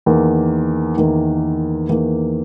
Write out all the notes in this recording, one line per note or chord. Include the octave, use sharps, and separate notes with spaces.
E2 D#3 A#3
E2 D#3 A#3
E2 D#3 A#3